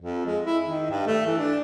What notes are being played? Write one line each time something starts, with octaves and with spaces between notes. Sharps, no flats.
F2
G#3
E4
D#3
G2
A3
E3
D4